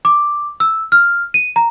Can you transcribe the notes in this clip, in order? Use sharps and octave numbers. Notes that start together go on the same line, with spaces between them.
D6
E6
F6
D#7
A#5